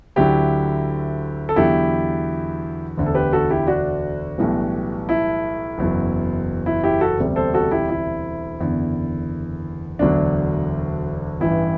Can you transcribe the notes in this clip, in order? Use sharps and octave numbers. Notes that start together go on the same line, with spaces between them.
D2 D3 F#3 E4 G4
A4
E2 D3 F#3 E4 G4
E1 D2 D3
A4
G4 B4
F#4 A4
E4 G4
D4 F#4
B1 A2 E3 G3
E4
F#1 E2 B2 F#3
E4
E4 G4
F#4 A4
E1 D2 C3 G3
A4 C5
F#4 A4
E4 G4
E4
F#1 E2 D3
E1 D2 D3 F#3 D4
A1 G2 E3 E4